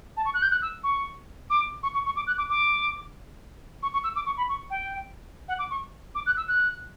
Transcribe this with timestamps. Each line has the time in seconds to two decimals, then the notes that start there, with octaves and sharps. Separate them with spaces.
0.17 A5
0.25 C#6
0.34 F#6
0.42 G6
0.51 F#6
0.62 E6
0.83 C#6
1.50 D6
1.83 C#6
1.94 C#6
2.05 C#6
2.16 D6
2.27 F#6
2.38 D6
2.49 D6
3.82 C#6
3.93 C#6
4.04 E6
4.16 D6
4.26 C#6
4.37 B5
4.49 C#6
4.70 G5
5.48 F#5
5.59 D6
5.70 C#6
6.15 D6
6.26 F#6
6.37 E6
6.48 F#6